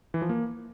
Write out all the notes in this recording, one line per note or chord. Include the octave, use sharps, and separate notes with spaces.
E3
F3
A#3